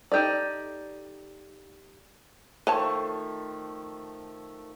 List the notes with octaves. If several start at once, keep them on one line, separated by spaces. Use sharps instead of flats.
D#4 G4 A4 D5
D#3 F3 A3 B4 C#5 A5